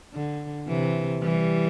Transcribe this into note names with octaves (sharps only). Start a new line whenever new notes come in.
D3
C3 E3
E3 G3